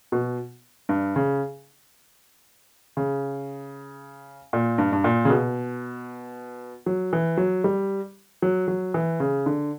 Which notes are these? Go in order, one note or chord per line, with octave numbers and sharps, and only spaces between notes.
B2
G2
C#3
C#3
A#2
G2
G2
A#2
C#3
B2
F#3
E3
F#3
G3
F#3
F#3
E3
C#3
D3